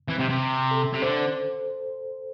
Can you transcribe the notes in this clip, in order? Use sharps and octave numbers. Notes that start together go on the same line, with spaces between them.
E3 C4
C3
C3
A4
C3
D3 C5